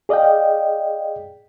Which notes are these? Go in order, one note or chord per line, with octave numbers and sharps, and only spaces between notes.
G#4 D5 D#5 F5 G5